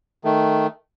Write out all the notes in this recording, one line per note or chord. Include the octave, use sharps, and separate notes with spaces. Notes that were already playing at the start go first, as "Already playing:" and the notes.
D#3 A3